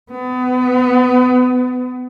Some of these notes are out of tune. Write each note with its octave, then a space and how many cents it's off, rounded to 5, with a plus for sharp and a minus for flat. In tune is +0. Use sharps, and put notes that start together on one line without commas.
B3 +30